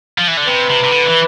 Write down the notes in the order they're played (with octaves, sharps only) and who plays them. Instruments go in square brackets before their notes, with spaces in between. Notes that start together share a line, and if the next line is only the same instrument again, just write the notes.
[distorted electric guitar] F3
E3
D3
[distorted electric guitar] C3 [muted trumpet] B4
[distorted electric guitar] C3
C3
D3
E3